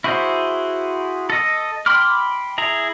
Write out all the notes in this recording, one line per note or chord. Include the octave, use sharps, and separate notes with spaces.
E4 F#4 G#4 C5
A4 D#5
G5 B5 C6 D6 F6
E4 G#4 A#5